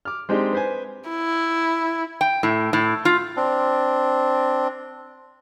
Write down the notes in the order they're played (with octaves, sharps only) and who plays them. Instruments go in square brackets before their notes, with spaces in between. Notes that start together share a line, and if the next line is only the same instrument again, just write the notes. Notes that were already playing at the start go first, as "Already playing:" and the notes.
[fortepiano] D6 F6
G#3 C4 D4 D#4 G4
B4 C5 G#5
[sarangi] E4
[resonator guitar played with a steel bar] G5
A2
A2
F4
[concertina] C4 D4